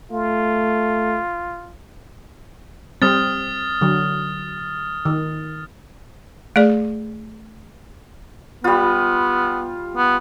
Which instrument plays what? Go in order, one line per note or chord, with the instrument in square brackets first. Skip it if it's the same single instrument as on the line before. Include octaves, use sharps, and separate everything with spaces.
[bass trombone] A3 [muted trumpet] F4
[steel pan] G3 C4 [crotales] D#6 F6 A6
[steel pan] D3 F#3
D#3
[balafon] A3 G#4 D5
[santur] G3 F4 [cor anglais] B3
[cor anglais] B3